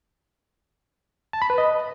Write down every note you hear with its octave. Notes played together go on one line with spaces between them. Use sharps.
A5
B5
B4
D#5